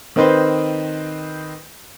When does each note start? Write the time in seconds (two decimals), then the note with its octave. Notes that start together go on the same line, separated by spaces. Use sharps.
0.16 D#3 C4 D#4 B4 C5